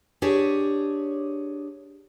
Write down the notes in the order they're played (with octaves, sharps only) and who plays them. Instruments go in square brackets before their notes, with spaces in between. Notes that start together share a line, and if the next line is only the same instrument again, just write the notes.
[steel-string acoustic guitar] D4 G4 G#4 C#5